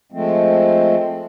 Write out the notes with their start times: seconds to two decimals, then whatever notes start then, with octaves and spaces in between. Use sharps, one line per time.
0.12 F3 G#3 A3 C4